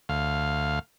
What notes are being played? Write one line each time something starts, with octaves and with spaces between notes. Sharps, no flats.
D2 F5